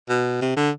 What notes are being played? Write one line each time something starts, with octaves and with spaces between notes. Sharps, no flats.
B2
C3
D3